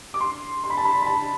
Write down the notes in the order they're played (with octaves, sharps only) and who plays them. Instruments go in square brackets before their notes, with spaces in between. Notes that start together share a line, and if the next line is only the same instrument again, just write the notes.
[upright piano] D6
C6
C6
B5
A5
B5
B5
A5